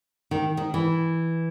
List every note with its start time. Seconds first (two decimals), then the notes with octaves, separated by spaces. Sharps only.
0.31 D#3
0.57 D#3
0.74 E3